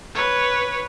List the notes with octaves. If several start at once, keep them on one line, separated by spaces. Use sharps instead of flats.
B4 C#5